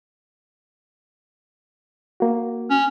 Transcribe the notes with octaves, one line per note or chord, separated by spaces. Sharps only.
A#3 F#4
C#4